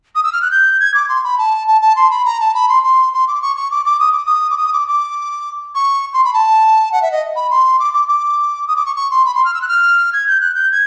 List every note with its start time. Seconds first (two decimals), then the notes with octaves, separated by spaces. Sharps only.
0.15 D#6
0.23 E6
0.33 F6
0.42 F#6
0.51 G6
0.80 G#6
0.94 D6
1.08 C6
1.23 B5
1.38 A5
1.67 A5
1.81 A5
1.96 C6
2.10 B5
2.25 A#5
2.40 A5
2.54 B5
2.68 C6
2.83 C6
3.13 C6
3.27 D6
3.42 C#6
3.56 C#6
3.70 D6
3.85 D6
3.99 D#6
4.12 D6
4.25 D#6
4.50 D6
4.58 D#6
4.73 D6
4.88 D6
5.75 C#6
6.13 C6
6.24 B5
6.33 A5
6.92 F#5
7.02 E5
7.11 D#5
7.36 B5
7.50 C6
7.79 D6
7.93 D6
8.08 D6
8.67 D#6
8.76 D6
8.86 C#6
8.96 C#6
9.10 C6
9.25 B5
9.34 C6
9.45 F6
9.54 E6
9.61 F#6
9.68 F6
10.13 G#6
10.27 G6
10.40 F#6
10.54 G6
10.71 G#6